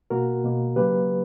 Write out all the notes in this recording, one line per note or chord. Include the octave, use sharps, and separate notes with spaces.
B2 A#3 F#4 A#4
B2 A#3
C#3 F#3 A#3 G4 B4